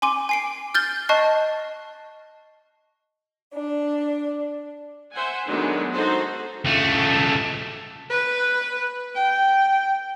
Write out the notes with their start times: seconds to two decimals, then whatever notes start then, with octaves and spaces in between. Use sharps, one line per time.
0.02 G#5 C6 D6 D#7
0.29 G#5 C7 D7
0.74 F6 G6 A6 G7
1.09 D#5 A5 C#6 F#6 C7
3.52 D4
5.13 C5 E5 F#5 G#5
5.47 D#3 F#3 G#3 A3 B3 D4
5.93 D#4 F#4 G#4 A4 C5
6.65 C#2 A3
8.10 B4
9.15 G5